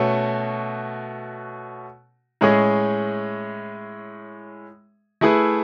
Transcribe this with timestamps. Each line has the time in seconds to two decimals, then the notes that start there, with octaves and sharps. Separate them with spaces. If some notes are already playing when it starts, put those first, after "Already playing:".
Already playing: B2 A3 C#4 F#4
2.41 A2 G#3 C#4 G#4
5.21 A3 E4 G#4 B4